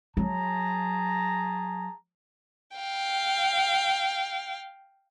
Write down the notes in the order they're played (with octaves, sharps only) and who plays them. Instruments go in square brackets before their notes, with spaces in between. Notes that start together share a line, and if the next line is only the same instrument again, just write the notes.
[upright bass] F#3 [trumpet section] G#4 A5 A#5
[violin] F5 G5